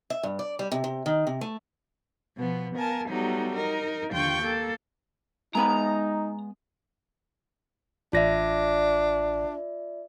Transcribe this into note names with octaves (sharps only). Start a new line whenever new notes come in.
E5
G2
D5
G3
C3
C3
D#3
C3
A3
B2 F3 B3
B3 A#4 F5 G#5 A5
F#3 G3 A3 B3 D#4
D#4 A#4 D#5
D#2 D3 F4 G5 C#6 G6
A#3 A4
G#3 B3 D#4 A#5 B5
A1 D4 F4 D5 E5 A#6